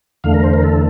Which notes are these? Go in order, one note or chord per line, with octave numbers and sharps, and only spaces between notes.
E2 D3 A3 F5
A#4
C5
A#4
A4